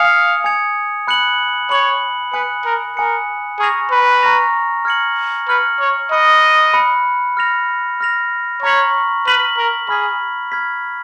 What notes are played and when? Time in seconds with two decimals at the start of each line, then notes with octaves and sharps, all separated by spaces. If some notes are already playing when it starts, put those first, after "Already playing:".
Already playing: F5 G#5 D#6 G#6 C#7 F7
0.44 G#5 D#6 G#6 C#7 F7
1.07 B5 F#6 C#7 F#7
1.70 C#5 B5 F#6 C#7 F#7
2.33 B4 G#5 D#6 F#6 C#7
2.66 A#4
2.97 A#4 G#5 D#6 F#6 C#7
3.59 G#4 A#5 C#6 F6 A#6 F7
3.91 B4
4.23 A#5 C#6 F6 A#6 F7
4.85 F6 G#6 C#7 F#7
5.48 B4 F6 G#6 C#7 F#7
5.80 C#5
6.12 D#5 B5 F#6 C#7
6.74 B5 F#6 C#7
7.37 F6 A#6 F7
8.00 F6 A#6 F7
8.62 C#5 A#5 C#6 F6 B6 F#7
9.26 B4 A#5 C#6 F6 B6 F#7
9.58 A#4
9.89 G#4 B5 F6 G#6 B6
10.52 B5 F6 G#6 B6